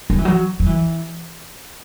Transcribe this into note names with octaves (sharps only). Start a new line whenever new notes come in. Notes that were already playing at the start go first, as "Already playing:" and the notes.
F#3
E3
F#3
F#3
E3